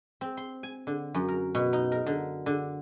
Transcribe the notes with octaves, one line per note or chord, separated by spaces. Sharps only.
C4
C6
G#5
D3
F#2
A#4
B2
D#4
A#4
D3
D3